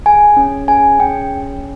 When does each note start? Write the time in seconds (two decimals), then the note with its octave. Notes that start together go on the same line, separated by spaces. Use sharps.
0.06 G#4 G#5
0.37 C#4
0.68 G#4 G#5
0.99 C#4 G5